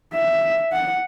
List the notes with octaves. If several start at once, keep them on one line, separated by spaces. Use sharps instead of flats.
E5
F#5